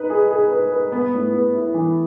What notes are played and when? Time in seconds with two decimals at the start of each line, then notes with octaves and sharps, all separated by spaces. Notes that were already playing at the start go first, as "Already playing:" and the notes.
Already playing: D#4 B4
0.10 G#4
0.31 G#4
0.52 B4
0.72 B4
0.92 B3
1.14 A2
1.34 B3
1.55 E4
1.74 E3